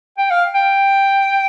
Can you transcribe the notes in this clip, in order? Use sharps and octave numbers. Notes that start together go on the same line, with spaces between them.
G5
F5
G5